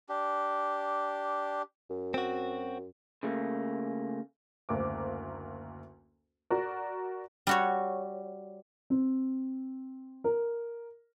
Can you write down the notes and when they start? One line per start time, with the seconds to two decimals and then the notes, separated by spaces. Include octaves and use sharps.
0.09 D4 G4
1.90 F#2
2.14 C4 F#4
3.23 C#3 A3 A#3
4.69 F#1 D2 A#3 D6
6.50 F#4 A#4 D5
7.47 G3 F#4 C#5
8.90 C4
10.24 A#4